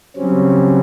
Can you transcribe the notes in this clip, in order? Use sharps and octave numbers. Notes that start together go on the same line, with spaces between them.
C#3 F#3 G3 C4 C#4